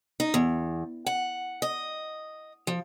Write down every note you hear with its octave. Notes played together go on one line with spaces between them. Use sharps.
D#4
E2
F#5
D#5
F3